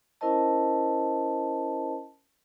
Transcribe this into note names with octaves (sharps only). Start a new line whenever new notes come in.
C#4 E4 A#4 C5 D#5 A5